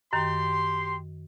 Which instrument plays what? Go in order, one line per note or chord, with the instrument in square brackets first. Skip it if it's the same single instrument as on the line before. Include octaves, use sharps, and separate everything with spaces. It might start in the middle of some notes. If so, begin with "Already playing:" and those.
[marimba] F#2 D#3 [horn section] G4 C6